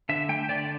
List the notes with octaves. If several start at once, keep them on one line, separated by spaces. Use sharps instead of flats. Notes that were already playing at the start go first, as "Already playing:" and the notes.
D3 E5
A3 G5
D3 D5